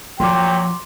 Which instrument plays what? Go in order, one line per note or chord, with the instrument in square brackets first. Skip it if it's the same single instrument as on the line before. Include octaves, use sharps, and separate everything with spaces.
[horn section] A#2 F#3 [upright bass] F3 [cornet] G5 [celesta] C6 D6